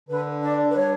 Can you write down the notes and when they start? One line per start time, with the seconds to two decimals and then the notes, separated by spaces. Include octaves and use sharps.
0.09 D3 B4
0.42 D4 D5
0.71 B4
0.76 G3 C#5